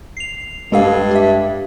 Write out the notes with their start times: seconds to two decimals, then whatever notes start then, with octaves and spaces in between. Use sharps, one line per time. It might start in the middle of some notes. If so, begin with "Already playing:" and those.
0.17 C7 F7
0.72 G2 G#3 A4 F5
1.11 G4 E5